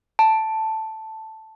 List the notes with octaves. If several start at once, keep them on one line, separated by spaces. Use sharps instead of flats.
A5